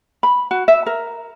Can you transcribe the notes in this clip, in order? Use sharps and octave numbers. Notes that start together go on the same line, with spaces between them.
B5
F#4
E5
A#4